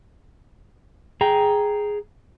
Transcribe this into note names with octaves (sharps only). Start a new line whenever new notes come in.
G#4 G5 A#5